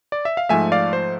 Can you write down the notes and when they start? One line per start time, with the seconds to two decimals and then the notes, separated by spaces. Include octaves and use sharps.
0.12 D5
0.25 E5
0.37 F5
0.49 G#2 F3 A3 E5 G#5
0.72 D5 F5
0.93 C5